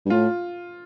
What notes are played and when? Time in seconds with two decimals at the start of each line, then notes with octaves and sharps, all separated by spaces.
0.06 G2
0.10 A2 F4